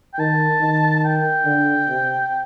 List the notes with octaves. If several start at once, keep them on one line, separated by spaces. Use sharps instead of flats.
G5
D#3 A5
D#3
A5
G5
D3
C3